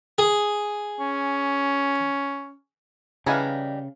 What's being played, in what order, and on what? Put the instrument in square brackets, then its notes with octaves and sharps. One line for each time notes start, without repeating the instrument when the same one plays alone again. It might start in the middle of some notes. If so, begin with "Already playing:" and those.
[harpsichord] G#4
[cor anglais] C#4
[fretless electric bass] C#3 [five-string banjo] E3 G3 D#4 [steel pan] F5 F#5 G#5